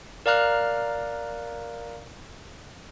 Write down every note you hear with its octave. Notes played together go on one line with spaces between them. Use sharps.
A#4 D5 F5 A#5 F6 F#6